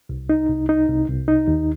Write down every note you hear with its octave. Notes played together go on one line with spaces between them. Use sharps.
C2
D#4
C2
D#4
C2
C2
D#4
D#2